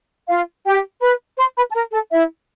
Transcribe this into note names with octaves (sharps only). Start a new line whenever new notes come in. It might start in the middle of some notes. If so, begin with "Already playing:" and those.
F4 F5
G4 G5
B4 B5
C5 C6
B4 B5
A5
A#4 A#5
A4 A5
E4 E5